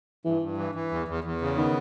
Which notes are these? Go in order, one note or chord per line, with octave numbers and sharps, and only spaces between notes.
G2 E3
G2
E3
E3
E2
E2
E2
C#3
D#3 B3